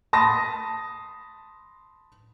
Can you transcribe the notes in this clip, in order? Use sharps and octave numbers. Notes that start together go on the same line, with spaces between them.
A5 B5 C6 D#6 A#6